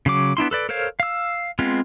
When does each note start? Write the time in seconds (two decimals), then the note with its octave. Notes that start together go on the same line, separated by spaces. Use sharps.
0.06 C#3 F#3 D6
0.37 B3 D4 E4 C6
0.51 A4 B4 D5
0.69 A4 A#4 C5 C#5 F5
1.00 F5 E6
1.59 G#3 B3 C4 F4